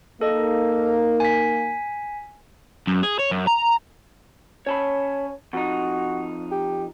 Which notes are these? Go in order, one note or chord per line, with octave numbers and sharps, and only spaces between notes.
A#3 D#4 A4 D#5
G#5 B6
F#2
G#4
C#5
F#2
A#5
C#4 C#5 A5 B5
F2 D#4 F#4
G4